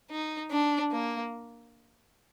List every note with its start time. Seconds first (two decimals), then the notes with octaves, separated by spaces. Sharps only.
0.11 D#4
0.51 D4
0.91 A#3